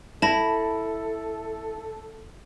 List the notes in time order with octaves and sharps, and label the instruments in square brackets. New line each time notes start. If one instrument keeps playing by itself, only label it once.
[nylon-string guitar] E4 [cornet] A4 [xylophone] A5 B5 A#6